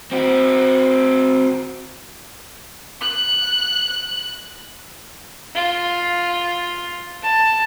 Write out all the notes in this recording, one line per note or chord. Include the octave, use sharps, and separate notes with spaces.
C4 F#4
F#6
F4
A5